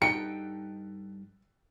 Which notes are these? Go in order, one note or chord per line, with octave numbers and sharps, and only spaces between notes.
G2 D#4 A4 G5 C#7